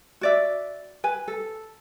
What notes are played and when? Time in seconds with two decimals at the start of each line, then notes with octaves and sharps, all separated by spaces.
0.21 F#4 D5 E5
1.04 B4 G#5
1.28 A4